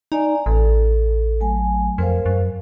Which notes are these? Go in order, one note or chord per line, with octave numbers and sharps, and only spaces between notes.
D#4 D5 G#5 A#5
A1 A4
F#3 A3 G#5
F2 A#4 C5 F5
F#2